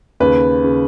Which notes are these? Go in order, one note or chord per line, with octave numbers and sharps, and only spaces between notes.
D#2 C#3 B4
C#3